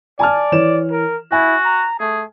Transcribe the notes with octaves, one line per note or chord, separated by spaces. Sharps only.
D5 G#5 A5 F6
E3 C#5 E7
A#4
E4 F#4 G#5
A#5
A3 G#4